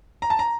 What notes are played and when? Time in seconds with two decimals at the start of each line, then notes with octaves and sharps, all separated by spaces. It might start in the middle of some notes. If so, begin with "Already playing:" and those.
0.22 A#5
0.30 A5
0.39 A#5